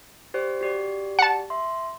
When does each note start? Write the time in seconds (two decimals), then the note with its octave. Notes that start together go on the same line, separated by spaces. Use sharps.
0.34 G4 C5 D5
0.61 F#4 G4 D5
1.19 F#5 A5
1.50 E5 C6